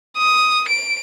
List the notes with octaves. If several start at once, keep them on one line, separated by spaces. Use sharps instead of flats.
D#6
D7